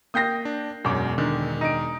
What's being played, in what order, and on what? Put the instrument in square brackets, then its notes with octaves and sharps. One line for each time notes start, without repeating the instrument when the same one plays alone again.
[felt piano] A#3 G5 A#6 [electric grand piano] D#6 G6 C7
[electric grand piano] D4
[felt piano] E1 D6 [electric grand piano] F#2 F#3
[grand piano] D3 [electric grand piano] D#3
[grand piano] D#4 D7